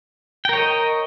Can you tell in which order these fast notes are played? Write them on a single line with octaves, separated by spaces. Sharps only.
G5 A#4 C#5 D#5